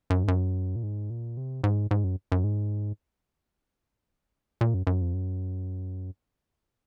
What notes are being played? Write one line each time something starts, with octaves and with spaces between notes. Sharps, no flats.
F#2
G#2
F#2
A#2
G#2
A#2
C3
G#2
G#2
F#2
F#2
G#2
A#2
F#2
F#2
F2
F#2